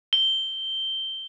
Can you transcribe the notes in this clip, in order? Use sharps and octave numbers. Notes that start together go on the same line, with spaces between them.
G7